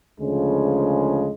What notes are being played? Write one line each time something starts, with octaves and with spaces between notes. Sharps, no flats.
D2 C#3 F3 G#3